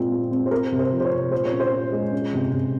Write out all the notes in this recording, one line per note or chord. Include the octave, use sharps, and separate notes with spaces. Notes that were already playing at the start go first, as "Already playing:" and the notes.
Already playing: A#2 G#3 C4
C4
C4
C5
C4 A#4
C3
C5
F3
C5
C#5
C3
A#2 C5
C#5
C#4
C5
A#2
G#3
C#4
C3
C3